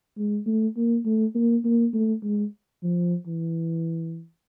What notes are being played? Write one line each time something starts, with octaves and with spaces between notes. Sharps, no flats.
G#3
A3
A#3
A3
A#3
A#3
A3
G#3
F3
E3